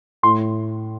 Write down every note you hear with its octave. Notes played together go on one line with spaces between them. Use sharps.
A2 C6